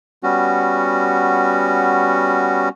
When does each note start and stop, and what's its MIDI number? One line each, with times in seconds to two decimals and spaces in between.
0.23 2.69 55
0.23 2.69 59
0.23 2.69 61
0.23 2.69 66